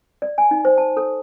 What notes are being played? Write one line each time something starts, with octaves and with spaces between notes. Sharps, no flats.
D5
G#5
D#4
C5
A5
A4